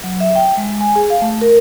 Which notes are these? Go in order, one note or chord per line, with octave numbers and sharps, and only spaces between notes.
F#3
E5
G5
G#3
G#5
G#4
F5
A3
A#4